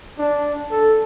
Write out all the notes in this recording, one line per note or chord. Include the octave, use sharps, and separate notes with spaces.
D4
A4